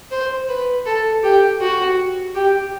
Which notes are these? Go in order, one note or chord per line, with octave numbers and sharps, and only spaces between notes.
C5
B4
A4
G4
F#4
G4